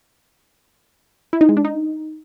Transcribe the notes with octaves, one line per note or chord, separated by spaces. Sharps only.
E4
D#4
G#3
D4
D#4